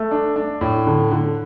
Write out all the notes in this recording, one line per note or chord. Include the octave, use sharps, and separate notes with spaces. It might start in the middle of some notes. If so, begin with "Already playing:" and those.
Already playing: A3
D4
D4
A2
D3
D3